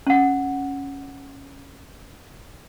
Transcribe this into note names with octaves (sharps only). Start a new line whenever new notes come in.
C#4 F#5